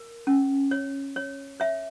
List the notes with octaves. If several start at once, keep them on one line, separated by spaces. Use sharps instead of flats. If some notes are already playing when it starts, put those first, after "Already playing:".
Already playing: A#4
C#4
C#5
C#5
C#5 E5